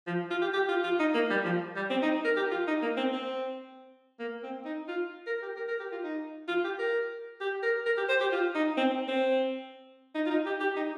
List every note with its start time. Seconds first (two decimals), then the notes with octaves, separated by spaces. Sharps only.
0.07 F3
0.31 F4
0.42 G4
0.54 G4
0.69 F4
0.84 F4
0.99 D#4
1.14 A#3
1.30 G3
1.45 F3
1.76 G3
1.90 C4
2.02 D#4
2.25 A#4
2.36 G4
2.51 F4
2.68 D#4
2.82 A#3
2.97 C4
3.13 C4
4.19 A#3
4.43 C4
4.65 D#4
4.88 F4
5.26 A#4
5.42 G4
5.57 A#4
5.68 A#4
5.80 G4
5.92 F4
6.03 D#4
6.48 F4
6.64 G4
6.79 A#4
7.41 G4
7.63 A#4
7.86 A#4
7.97 G4
8.09 C5
8.21 G4
8.32 F4
8.55 D#4
8.77 C4
9.08 C4
10.15 D#4
10.26 F4
10.30 D#4
10.46 G4
10.60 G4
10.76 D#4